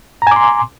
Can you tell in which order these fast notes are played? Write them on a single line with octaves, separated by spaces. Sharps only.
A#5 G#5 D6 C6